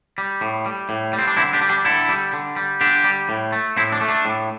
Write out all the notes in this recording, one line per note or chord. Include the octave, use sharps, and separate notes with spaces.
G3
A2
G3
A2
G3
C4
D4
D3 C4 E4
D4 G4
G3
D4 G4
D3 E4 A4
G3
D3
G3
D3 D4 G4
G3
A2
A3
A2 C4 E4
D4
A3
D4
A2